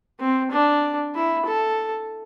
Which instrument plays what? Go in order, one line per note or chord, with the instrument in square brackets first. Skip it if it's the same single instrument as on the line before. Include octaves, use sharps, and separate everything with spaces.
[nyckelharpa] C4
D4
E4
A4